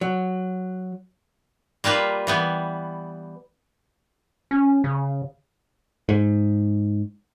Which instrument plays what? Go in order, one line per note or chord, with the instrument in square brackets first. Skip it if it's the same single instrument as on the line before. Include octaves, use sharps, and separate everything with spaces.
[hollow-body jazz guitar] F#3
[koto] G3 A#3 F4 B4
E3 G3 B3
[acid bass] C#4
C#3
[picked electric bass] G#2